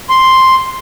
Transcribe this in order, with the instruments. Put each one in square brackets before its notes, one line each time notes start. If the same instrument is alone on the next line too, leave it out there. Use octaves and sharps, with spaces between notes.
[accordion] C6